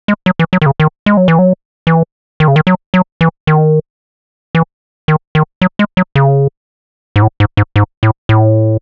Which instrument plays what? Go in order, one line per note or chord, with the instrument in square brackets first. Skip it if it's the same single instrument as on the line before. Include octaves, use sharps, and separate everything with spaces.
[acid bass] G#3
F#3
E3
F#3
D#3
C#3
D#3
G#3
F#3
E3
F#3
E3
D#3
C#3
D#3
F#3
F#3
E3
D#3
E3
D#3
D#3
F#3
G#3
F#3
C#3
G#2
A2
G#2
G#2
G#2
A2
A2